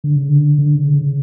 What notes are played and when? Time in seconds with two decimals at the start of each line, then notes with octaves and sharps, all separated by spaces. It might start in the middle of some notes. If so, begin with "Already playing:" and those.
0.04 D3
0.16 C#3
0.29 D3
0.58 D3
0.75 C#3
0.94 C#3